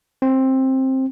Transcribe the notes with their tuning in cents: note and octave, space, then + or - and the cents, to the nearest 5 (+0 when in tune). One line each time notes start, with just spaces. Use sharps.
C4 +15